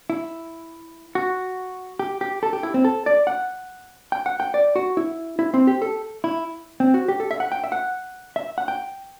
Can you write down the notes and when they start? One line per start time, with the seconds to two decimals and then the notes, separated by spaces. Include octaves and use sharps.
0.10 E4
1.15 F#4
1.99 G4
2.21 G4
2.43 A4
2.53 G4
2.63 E4
2.74 C4
2.85 A4
3.06 D5
3.27 F#5
4.12 G5
4.26 F#5
4.40 G5
4.54 D5
4.76 F#4
4.97 E4
5.39 E4
5.54 C4
5.67 G4
5.82 A4
6.24 E4
6.80 C4
6.94 F#4
7.08 G4
7.20 A4
7.31 E5
7.40 F#5
7.52 G5
7.64 E5
7.72 F#5
8.36 E5
8.58 F#5
8.68 G5